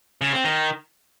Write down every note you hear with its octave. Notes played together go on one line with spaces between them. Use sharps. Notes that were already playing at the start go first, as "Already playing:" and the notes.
C#3
C4
D#3